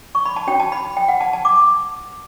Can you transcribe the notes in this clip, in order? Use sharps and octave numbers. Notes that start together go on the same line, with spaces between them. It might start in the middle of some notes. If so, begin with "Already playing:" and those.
C#6
B5
A5
C#4 F#4 C#5 G5
A5
B5
G5
F#5
A5
A5
D6